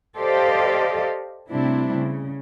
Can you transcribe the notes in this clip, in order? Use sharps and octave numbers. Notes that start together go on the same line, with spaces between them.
G4 A4 C5 D5 D#5 F5
A2 C3 G3 C4 D4 E4
C#3